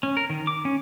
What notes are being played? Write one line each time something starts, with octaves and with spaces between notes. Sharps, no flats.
C#4
A#4
D#3
D6
C#4